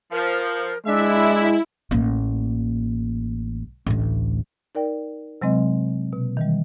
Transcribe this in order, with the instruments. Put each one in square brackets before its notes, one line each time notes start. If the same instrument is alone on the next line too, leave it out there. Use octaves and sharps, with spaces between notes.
[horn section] F3 [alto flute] A#4
[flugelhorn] G#3 [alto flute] D4 [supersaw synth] E4 [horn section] E5
[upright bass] A1 A#3
A1 D2
[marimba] D#4 A#4 D5 G5
C3 F#3 G#3 C4 D#5
B2 A#3
D#3 E3 G3